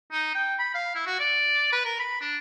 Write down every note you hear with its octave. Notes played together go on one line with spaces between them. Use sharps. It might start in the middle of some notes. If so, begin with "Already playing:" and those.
D#4
G5
B5
F5
E4
F#4
D5
B4
A#4
B5
D4